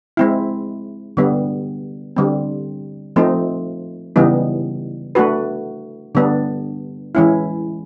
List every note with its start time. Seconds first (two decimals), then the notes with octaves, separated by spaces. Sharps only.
0.17 G#3 C4 E4
1.17 D3 G3 B3
2.16 D3 G3 C4
3.16 F3 A3 C4 D#4
4.16 C#3 E3 G3 B3 D#4
5.15 A3 D4 F#4 B4
6.15 D3 G3 B3 D4
7.15 E3 G#3 C#4 E4